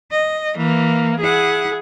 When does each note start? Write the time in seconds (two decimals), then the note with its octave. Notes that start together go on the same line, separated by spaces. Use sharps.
0.11 D#5
0.57 E3 A#3
1.20 E4 G#4 F#5